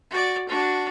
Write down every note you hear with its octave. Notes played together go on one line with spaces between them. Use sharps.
F#4 D5
D4 F#4